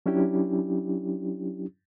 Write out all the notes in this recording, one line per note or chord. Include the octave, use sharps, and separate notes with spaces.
F#3 C#4 D4 E4 G4